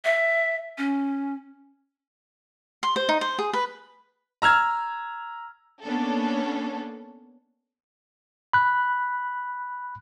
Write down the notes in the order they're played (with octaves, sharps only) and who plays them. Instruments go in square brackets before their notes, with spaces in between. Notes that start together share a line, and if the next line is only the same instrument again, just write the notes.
[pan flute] E5
C#4
[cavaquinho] C6
C5
D#4
C5
G#4
B4
[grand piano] A#5 E6 F6 G#6
[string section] A#3 B3 C#4 D4 A4
[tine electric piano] B5 F#6